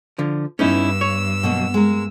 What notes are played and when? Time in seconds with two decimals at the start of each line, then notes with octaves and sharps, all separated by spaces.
0.18 D3 F3
0.59 G2 B3 C#4 D#4 E4 E6
1.01 C#5
1.43 B2 F#3 A#3
1.74 G#3 A#3 A#4